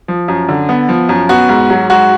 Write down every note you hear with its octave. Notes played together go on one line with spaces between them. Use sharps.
F3
F#2
D3
B3
F3
F#2
B3 F#4
G#2
F#3
G#2 F#4